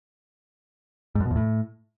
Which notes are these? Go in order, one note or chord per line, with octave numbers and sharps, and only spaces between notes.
G#2
F#2
B2
E2
A2